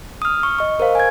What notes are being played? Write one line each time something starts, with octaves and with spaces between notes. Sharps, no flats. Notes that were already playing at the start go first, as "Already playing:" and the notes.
D#6 F6
C#6
D#5 C#6
A#4 C5 F5
G#5 G#6